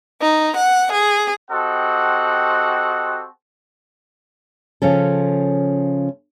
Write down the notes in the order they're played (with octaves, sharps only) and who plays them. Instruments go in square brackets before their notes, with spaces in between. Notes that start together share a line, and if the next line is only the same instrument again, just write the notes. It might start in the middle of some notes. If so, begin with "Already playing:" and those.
[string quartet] D#4
F#5
G#4
[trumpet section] C4 F#4 G4 A4 D#5 F#5
[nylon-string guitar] C#3 F3 C#4 A4